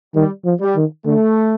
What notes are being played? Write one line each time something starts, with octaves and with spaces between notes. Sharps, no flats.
D#3 G3
F3
G3
D#3
D3 A3